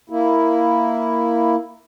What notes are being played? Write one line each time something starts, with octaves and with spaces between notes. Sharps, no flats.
A#3 E4